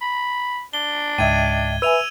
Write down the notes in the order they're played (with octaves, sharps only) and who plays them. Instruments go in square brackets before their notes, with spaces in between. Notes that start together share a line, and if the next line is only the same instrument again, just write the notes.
[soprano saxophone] B5
[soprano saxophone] D4 [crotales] G7
[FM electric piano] C#2 G#2 [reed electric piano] D#5 E5 G5 [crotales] G#6 D#7
[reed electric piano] B4 E5 G#5 [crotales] E6 D#7 F7